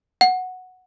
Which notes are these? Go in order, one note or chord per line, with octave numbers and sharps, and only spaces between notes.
F#5